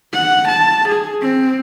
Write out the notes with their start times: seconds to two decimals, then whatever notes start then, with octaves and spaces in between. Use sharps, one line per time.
0.13 F#5
0.48 A5
0.89 G#4
1.22 C4